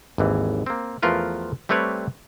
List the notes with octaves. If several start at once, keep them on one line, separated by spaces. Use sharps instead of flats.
G#1 D#2 E3
A#3 C4
E2 F3 A3 F4 A#4 B4
G3 A3 C4 B4 C#5 D5